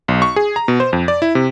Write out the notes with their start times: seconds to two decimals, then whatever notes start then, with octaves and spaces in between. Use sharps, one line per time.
0.08 B1
0.22 C#6
0.36 G#4
0.56 A#5
0.68 B2
0.80 C5
0.93 F2
1.08 D5
1.22 E4
1.35 C3